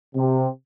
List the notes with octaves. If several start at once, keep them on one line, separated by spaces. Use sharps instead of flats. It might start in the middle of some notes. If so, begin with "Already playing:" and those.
C3